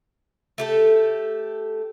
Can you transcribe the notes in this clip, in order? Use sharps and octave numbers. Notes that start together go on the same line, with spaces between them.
A3 G4 A4